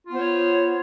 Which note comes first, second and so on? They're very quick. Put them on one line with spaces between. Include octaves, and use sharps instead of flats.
F4 B3 C5 C#5